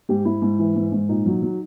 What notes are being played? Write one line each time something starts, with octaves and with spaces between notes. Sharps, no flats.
G#2 G4
G#2 E4
G#2
E3
G#2
G#2
A#2 D#4
F#3
F#3